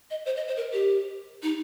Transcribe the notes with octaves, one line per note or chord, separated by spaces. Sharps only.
D#5
C5
D#5
C5
A#4
G4
D#4